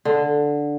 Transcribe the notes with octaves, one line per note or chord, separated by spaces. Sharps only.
D3